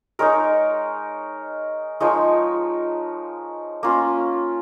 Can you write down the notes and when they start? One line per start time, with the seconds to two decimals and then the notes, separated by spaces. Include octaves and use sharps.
0.19 G#3 D#4 A#4 C#5
2.00 F3 G#3 D#4 A#4 C#5
3.83 A#3 C#4 F4